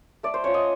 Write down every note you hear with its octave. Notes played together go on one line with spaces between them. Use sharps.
A3 D5
C5
C#4 F4 C#5
D#5